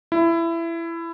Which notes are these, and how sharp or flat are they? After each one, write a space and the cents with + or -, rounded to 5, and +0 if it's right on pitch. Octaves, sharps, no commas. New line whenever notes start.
E4 +20